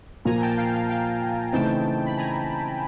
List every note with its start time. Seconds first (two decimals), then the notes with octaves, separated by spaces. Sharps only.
0.25 A#2 F3 A#3 G#5 A#5
0.41 G5 A5
0.56 F5 G5
0.73 F5 G5
0.89 F5 G5
1.53 C#3 E3 A3 C4 D#4 G5 A5
2.05 B5
2.17 G#5 A#5